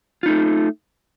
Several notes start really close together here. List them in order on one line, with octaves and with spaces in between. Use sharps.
F4 D#4 A3